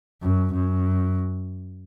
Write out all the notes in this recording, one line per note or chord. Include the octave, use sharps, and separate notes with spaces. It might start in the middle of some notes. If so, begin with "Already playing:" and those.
F#2
F#2